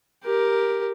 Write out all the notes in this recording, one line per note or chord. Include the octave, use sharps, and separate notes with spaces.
G4 A#4